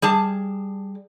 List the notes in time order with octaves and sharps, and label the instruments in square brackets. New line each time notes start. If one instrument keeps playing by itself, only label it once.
[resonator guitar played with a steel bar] G3 G#4 A5